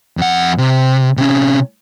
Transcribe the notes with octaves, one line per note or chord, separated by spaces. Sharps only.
F2 F#5
C3
C3 C#4